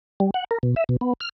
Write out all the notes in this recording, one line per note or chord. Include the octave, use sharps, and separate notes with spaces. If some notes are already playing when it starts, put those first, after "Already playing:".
G3
F#5
A#4
B2
E5
B2
B3
F6